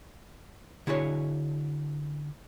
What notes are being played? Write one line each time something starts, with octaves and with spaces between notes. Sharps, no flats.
D3 E4 F#4 G#4 C#5